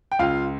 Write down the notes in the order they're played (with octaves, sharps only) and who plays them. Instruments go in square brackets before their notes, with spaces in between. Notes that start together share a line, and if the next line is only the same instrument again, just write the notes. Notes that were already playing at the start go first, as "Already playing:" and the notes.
[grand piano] G5
C#2 F4 F5